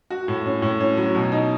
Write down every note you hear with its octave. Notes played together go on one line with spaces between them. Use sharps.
F#4
A2
C#4
A2
C#4
F#3
B2
D#4